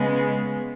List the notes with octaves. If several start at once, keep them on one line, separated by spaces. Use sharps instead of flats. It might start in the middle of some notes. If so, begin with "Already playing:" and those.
Already playing: C#3 G#3 B3